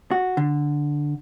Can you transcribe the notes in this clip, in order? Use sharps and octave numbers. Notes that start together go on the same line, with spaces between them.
F#4
D3